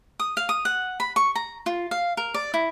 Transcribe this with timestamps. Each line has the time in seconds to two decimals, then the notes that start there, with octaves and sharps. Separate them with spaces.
0.19 D#6
0.37 F5
0.49 D#6
0.65 F#5
1.00 B5
1.16 C#6
1.35 A#5
1.66 F4
1.91 F5
2.17 A#4
2.34 D5
2.54 E4